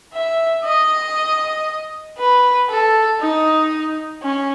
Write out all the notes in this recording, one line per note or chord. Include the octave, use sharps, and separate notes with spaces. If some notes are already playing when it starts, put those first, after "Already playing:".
E5
D#5
B4
A4
D#4
C#4